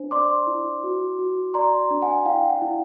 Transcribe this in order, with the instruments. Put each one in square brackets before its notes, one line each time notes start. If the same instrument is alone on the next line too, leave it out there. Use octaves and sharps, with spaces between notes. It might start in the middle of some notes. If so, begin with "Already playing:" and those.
Already playing: [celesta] D4 C5
D5 C6 D6
E4
F#4
F#4
D5 A#5 C6
D4
F#5 G#5
E4 F5 G5
F#5
E4